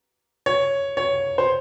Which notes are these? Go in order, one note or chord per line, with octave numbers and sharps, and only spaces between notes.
C#5
C#5
C5